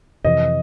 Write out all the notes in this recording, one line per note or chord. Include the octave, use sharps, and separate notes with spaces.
F2 C3 E3 D#5